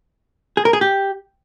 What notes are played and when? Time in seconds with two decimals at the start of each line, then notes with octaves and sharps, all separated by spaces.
0.57 G#4
0.65 A#4
0.73 G#4
0.81 G4